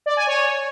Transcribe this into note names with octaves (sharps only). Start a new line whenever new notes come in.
D5
G#5
C#5